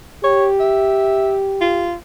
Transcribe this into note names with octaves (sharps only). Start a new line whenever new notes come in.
G4 C#5
E5
F4